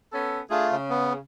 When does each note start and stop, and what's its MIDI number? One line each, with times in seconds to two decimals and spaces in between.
0.13 0.40 59
0.13 0.40 61
0.13 0.40 69
0.51 0.76 57
0.51 0.67 62
0.51 0.76 65
0.51 0.67 68
0.72 1.19 49
0.90 1.13 59